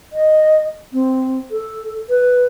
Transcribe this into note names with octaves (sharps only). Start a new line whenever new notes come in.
D#5
C4
A4
B4